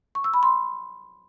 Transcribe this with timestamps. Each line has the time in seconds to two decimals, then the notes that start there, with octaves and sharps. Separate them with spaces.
0.15 C#6
0.24 E6
0.34 B5
0.43 C6